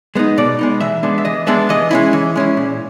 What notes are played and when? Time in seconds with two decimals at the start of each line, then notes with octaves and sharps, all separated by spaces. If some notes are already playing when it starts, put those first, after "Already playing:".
0.15 G#3 B3 D#4
0.38 B2 D5
0.59 G#3 B3 D#4
0.81 E3 E5
1.03 G#3 B3 D4
1.18 E5
1.25 E3 D#5
1.47 G#3 B3 D4 E5
1.69 E3 D#5
1.91 G#3 C#4 E4
2.13 E3
2.35 G#3 C#4 E4
2.57 A#2